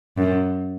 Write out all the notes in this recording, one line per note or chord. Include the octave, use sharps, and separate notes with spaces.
F#2